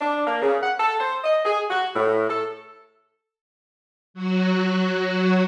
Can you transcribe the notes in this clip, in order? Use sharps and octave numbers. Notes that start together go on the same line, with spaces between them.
D4
A#3
C#3
F#5
A4
C5
D#5
G#4
F#4
A2
A4
F#3 F#4